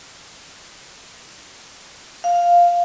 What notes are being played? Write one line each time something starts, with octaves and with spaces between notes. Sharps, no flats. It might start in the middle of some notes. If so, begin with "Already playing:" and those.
F5